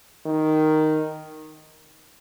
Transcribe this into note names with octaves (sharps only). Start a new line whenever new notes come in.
D#3